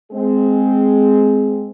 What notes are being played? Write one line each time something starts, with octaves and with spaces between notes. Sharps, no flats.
G#3 C4 G#4